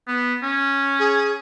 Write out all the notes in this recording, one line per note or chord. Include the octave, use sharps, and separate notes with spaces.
B3
C#4
G#4